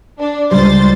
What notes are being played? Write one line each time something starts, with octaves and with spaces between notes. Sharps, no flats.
D4
C#2 G3 C5 A6